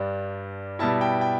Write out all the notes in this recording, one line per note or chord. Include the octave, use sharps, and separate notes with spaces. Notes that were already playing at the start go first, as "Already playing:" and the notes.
Already playing: G2 G3 D4
B2 G3 E4 A5
G5
G5